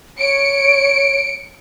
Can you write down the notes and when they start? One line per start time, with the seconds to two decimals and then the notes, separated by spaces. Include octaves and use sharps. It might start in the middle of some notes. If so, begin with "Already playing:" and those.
0.20 C#5 C#7 D7